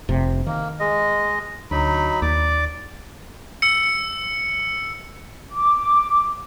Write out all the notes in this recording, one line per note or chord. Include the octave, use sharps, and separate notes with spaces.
F1 C3
D#3 A#3
G#3 D#5
D2 F#3 D#4 B5
D#2 D5 D6
E6 C#7
D6